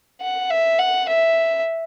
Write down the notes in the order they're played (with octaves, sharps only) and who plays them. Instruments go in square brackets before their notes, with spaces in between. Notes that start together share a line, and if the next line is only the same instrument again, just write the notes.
[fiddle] F#5
E5
F#5
E5